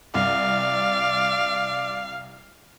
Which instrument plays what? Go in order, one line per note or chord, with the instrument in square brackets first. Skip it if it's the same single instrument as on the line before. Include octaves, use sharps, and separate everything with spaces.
[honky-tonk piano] C2 [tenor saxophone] D5 [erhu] F5